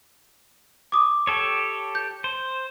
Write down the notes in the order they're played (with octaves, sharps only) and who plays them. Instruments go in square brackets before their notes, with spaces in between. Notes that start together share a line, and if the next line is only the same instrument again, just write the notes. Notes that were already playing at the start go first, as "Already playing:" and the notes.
[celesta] D6 D#6
[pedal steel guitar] G4 A4 C#5
[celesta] G6
[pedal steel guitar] C5